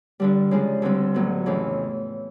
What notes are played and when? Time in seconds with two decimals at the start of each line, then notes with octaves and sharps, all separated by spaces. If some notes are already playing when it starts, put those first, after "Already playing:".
0.20 G2 D3 G3
0.51 C#3 F3 G#3
0.82 D2 D3 G3 C4
1.14 A2 F#3 B3
1.46 F2 C#3 E3 A3